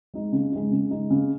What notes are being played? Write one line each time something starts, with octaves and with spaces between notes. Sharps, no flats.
G#3 D#4
C#3
G#3 D#4
C#3
G#3 D#4
C#3